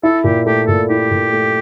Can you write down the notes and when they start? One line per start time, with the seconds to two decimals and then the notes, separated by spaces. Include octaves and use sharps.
0.03 E4 A4
0.24 A#2 G4
0.46 A3 G4
0.67 A#2 A4
0.90 E4 G4
1.11 A#2
1.33 A3